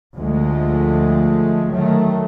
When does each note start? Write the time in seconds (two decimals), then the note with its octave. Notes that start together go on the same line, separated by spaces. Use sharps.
0.16 D2 F3 G#3 A3
1.72 D#3 F#3 A3